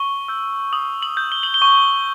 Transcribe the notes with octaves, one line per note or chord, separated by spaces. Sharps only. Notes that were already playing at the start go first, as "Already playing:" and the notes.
Already playing: C#6 G7
E6 G6
D#6 F#7
F#7
G6
G7
F#7
G7
C#6